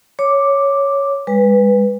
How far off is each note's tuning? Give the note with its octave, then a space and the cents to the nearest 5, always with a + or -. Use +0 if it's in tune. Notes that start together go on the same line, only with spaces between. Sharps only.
C#5 +0 D6 +0
G#3 -40 B4 +0